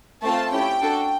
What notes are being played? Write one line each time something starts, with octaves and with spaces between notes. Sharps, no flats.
A3 C4 F4 A4 A5
A3 C#4 E4 G4 G5
D4 F#4 A4